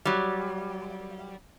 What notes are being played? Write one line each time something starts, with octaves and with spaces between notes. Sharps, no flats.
F#3 G3